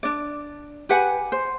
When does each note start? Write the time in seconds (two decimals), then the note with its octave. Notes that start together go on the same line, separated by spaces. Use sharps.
0.03 D4 D5
0.89 G4 B4 F#5 G#5
1.32 C5